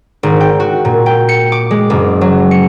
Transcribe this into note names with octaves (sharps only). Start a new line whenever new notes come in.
G#1
G5
F#4
A#2
G5
C#7
D6
G#3
F#1
F#3
C#7